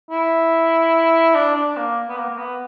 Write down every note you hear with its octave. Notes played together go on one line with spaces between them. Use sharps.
E4
D4
D4
A#3
B3
A#3
A#3
B3